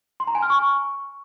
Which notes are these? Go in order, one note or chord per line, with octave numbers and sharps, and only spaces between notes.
C6
A#5
G#5
F6
C#6